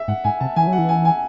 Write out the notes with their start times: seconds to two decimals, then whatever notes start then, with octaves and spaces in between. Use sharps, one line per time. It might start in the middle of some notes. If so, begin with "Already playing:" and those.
Already playing: E5
0.08 G#2 F#5
0.24 G#2 G#5
0.40 C3 A5
0.56 E3 G#5
0.67 F#3
0.72 F#5
0.78 E3
0.89 G#5
1.05 G#5